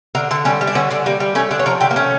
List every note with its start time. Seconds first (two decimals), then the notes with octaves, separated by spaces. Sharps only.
0.15 D3 A#4
0.31 D3 A4
0.45 G3 C#4
0.61 G3
0.67 D4
0.75 D3 C#4
0.90 D3 D4
1.06 G3 A#3
1.20 G3
1.35 A3 C#4
1.51 D3 D4
1.59 C#5
1.66 F3 A#4
1.80 D3 G4
1.91 A#3
1.96 A3 C#4